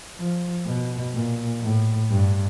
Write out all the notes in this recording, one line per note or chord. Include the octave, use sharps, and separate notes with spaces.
F3
B2
A#2
A2
G2